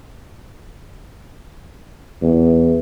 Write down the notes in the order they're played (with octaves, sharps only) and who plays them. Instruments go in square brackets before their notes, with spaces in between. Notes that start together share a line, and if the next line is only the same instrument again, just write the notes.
[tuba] E2